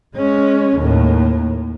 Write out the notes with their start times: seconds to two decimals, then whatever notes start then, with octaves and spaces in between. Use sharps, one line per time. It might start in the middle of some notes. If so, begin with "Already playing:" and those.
0.16 G#3 C#4
0.79 D#2 A2